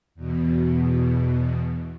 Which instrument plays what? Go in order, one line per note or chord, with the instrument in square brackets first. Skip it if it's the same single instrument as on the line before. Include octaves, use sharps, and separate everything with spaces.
[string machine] E2 B2